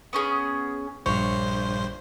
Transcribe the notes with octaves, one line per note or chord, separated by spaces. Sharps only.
B3 C#4 G#4
A#1 G2 C5 C#5